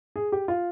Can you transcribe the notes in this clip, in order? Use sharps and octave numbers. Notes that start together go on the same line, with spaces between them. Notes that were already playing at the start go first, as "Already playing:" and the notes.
G#4
G4
F4